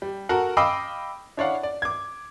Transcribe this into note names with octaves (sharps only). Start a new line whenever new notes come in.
G3
F#4 A4 A#4 F#5
D#5 F5 G5 B5 D6 E6
D4 E4 C#5 D5 F5 F#5
D5
D6 G#6